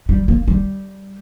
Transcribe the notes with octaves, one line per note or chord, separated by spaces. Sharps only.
G3
A#3
G3